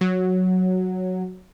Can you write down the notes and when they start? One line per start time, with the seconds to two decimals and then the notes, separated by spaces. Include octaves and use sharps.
0.01 F#3